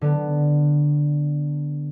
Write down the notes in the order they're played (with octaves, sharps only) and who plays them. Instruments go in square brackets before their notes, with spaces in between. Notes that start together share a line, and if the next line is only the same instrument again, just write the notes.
[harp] D3 B3